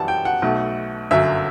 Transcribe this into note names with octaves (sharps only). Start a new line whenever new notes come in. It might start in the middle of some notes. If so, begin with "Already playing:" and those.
Already playing: F#2 E3 G3 F#5 A5
G5
F#5
B1 B2 A3
G1 F#2 F#3 E5